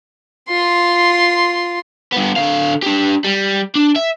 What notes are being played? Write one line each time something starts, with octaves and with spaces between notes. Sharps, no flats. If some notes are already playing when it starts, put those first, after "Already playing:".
F4 C6
G2 B3
D3 F5
D4 G4
G3
D4
E5